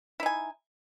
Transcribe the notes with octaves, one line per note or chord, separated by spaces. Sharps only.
D#4 E4 G#5